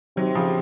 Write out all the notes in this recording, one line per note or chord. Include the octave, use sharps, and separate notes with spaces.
C3 D#3 F#3
C#3 F3